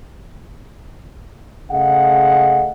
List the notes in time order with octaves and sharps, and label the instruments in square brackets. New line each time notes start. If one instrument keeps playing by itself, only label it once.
[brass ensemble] C#3 A3 G#4 D#5 F5 F#5